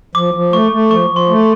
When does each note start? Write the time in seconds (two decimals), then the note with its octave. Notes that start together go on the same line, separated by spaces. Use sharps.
0.15 F3 D6
0.34 F3
0.53 A3 C#6
0.72 A3
0.91 F3 C#6
1.10 F3
1.16 C6
1.29 A3